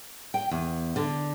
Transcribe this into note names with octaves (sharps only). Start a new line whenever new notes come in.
G5
E2
D3